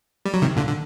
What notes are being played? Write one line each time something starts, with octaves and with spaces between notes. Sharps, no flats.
G3
F#3
C3 D#3
A#2 D3
D3